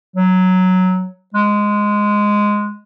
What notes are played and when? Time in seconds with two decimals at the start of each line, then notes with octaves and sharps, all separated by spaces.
0.16 F#3
1.34 G#3